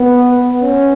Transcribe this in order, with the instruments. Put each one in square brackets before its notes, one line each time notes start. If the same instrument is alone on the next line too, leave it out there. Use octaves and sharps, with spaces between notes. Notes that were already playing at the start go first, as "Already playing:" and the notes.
Already playing: [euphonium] B3
C#4